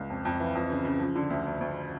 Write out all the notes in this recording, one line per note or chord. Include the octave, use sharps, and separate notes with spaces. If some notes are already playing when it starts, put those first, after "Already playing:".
Already playing: C#2
F2
F2
E3
F2
C#3
C#3
F3
D3
D2
D2
D2